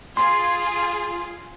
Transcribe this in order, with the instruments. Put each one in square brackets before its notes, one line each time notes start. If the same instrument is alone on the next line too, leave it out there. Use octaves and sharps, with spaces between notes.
[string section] F4 G#4 [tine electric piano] C6